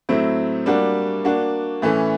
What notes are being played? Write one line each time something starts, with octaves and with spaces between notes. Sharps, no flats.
A2 F#3 A3 C4 E4
G3 A#3 D4 F#4
A#3 D4 F#4
A2 E3 A3 C#4